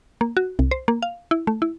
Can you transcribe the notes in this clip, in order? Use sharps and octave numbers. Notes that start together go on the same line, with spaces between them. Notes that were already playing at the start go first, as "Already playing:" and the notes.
A#3
F#4
C2
C5
A#3
F5
E4
A3
E4